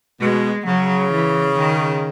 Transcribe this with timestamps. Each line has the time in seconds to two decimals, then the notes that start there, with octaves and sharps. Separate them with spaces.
0.20 B2 G#3
0.66 C#3 F#3
1.11 E3
1.56 D#3